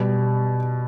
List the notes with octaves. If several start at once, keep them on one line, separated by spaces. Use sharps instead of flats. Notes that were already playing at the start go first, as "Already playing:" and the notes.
Already playing: B2 G3